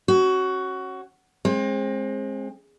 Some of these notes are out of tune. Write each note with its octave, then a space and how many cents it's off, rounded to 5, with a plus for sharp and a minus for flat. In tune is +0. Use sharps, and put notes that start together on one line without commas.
C#4 -25 F#4 +15
G#3 +0 C4 +30